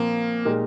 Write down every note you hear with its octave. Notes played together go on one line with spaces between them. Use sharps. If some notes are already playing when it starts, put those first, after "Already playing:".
Already playing: A#2 F3 A#3 C4
A#2 G#3 D#4 G4 A#4